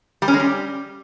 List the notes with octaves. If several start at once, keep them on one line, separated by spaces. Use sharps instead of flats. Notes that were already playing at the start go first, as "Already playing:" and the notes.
G3
C#4
G#3
G3